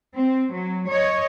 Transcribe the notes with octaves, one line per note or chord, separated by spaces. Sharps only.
C4
F#3
C#5 D#5